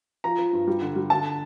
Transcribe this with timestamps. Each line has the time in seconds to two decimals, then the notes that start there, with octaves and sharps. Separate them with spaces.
0.24 F3 A#5
0.38 F3
0.53 G2
0.67 G3
0.82 D3
0.96 G3
1.10 D3 A5